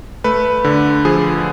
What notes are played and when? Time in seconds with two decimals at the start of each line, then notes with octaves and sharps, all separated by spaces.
0.24 A3 B4
0.64 D3
1.05 F3 G#4